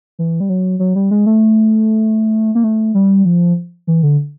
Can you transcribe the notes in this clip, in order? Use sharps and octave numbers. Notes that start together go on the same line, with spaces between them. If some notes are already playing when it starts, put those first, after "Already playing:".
E3
G3
F#3
F#3
G3
G#3
A3
A#3
A3
G3
F3
E3
D3